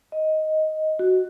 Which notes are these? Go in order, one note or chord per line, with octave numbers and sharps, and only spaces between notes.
D#5
F#4